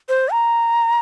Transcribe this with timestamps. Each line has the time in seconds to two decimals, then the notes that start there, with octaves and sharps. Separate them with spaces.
0.09 C5
0.32 A#5